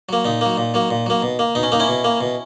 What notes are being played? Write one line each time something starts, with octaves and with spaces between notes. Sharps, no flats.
F#3 A#3
A#2 D#4
F#3 A#3
A#2
F#3 A#3
A#2
F#3 A#3
B2
A#3
B2 D#4
C#4
A#3 D#4
C#4 E4
B2
A#3
B2